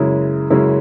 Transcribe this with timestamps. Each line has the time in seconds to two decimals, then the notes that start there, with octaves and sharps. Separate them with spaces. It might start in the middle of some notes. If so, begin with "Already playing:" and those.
Already playing: F#2 C#3 G#3 C#4 E4
0.50 F#2 C#3 G#3 C#4 E4